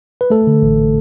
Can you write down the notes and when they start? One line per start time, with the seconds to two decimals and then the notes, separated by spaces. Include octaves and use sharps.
0.21 B4
0.30 A3 A4
0.47 D3
0.63 A1